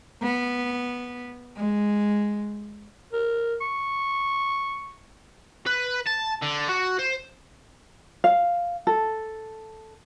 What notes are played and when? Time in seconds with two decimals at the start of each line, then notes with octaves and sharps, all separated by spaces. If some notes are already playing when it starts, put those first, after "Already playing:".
0.23 B3
1.57 G#3
3.13 A#4
3.61 C#6
5.66 B4
6.06 A5
6.42 D3
6.69 F#4
7.00 C5
8.24 F5
8.87 A4